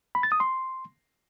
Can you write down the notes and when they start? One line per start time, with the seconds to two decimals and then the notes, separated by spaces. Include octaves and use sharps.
0.15 B5
0.23 A6
0.32 D#6
0.40 C6